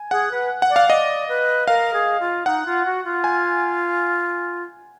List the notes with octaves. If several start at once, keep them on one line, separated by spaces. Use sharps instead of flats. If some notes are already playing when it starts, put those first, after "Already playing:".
Already playing: G#5
G#4 F#5
B4
F#5
D5
F5
D5 D#5
B4
A#4 F5
G#4
F4
D#4 F#5
F4
F#4
F4
G#5